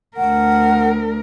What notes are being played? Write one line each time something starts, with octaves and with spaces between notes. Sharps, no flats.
D2 A#4 F#5